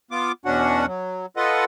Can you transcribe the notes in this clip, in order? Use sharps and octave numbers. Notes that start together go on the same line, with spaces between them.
B3 F4 D6
E2 B2 C#4 D4 F#4 F#5
F#3
F4 A4 B4 D#5 F#5